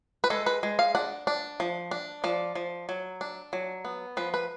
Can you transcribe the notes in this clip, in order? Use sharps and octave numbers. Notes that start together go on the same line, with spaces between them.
B4
G#3 A4
B4
G#3
F5
D4 F#5
D4
F3
D4
F3 D5
F3
F#3
D4
F#3
B3
F3 B4
B4